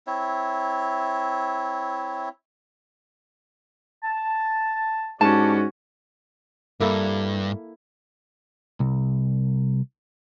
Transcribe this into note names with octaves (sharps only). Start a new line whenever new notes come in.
C4 E4 C#5 E5
A5
G#2 C#4 E4 F#4 G4 D5 A5
G2 A#3 E4 A4
C2